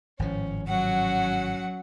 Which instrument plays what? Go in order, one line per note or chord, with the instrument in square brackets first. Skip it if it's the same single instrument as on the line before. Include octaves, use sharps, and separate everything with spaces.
[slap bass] G#1 A2 F3 [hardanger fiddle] C#4
[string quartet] F#3 F#5 [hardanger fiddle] C#4 F#4